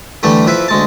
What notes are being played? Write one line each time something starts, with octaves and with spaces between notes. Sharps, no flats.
D3 E3 G3 A3
F2 E4 B4
D2 G#3 A5